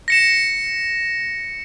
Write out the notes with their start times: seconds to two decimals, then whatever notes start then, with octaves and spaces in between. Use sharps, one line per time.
0.08 A#6 C#7 E7